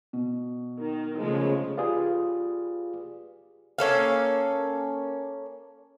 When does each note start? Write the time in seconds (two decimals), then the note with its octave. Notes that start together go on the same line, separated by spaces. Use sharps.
0.13 B2
0.81 D#3
1.18 C#3 F3 G#3 A3
1.78 F4 G4 G#4 B4 D5 F5
3.78 A#3 C#4 A4 F5